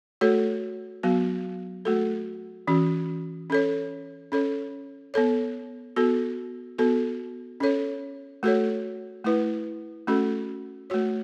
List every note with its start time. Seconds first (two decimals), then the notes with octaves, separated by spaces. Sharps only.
0.21 A3 F#4 A4 C#5
1.03 F#3 B3 F#4
1.85 A3 F#4 A4
2.67 E3 C#4 F#4
3.50 C#4 A4 C#5
4.32 C#4 A4 C#5
5.14 B3 A4 C#5
5.96 B3 F#4 A4
6.78 B3 F#4 A4
7.60 C#4 A4 C#5
8.43 A3 F#4 A4 C#5
9.25 A3 E4 B4
10.07 A3 C#4 F#4 A4
10.90 A3 F#4 C#5